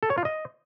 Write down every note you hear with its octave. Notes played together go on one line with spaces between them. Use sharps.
A4
C#5
F4
D#5